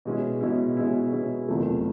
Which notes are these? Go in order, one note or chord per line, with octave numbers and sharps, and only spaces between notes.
B2 G#3 C#4 E4
B2 G#3 C#4 E4
B2 G#3 C#4 E4
B2 G#3 C#4 E4
F#1 E2 C3 F3 A3